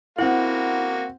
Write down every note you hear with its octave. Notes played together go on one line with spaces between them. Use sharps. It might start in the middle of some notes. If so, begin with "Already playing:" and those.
A#3 C4 E4 F#4 F#5